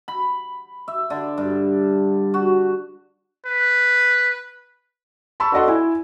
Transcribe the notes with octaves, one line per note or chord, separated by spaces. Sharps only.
B5
E5
D3
G2
F#4
B4
A5 B5 C#6 E6
D4 F#4 A4 D#5 F#5 C6
E4 G#5